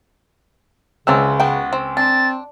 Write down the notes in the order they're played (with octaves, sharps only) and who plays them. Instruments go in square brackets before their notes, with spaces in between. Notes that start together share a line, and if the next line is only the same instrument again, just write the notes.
[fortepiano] C#2 C5 E6 [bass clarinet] C#3 [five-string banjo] E3 F#3 C4
[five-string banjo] B3 F#4 G5
C4
[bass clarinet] C4 [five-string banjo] D4 [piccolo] A6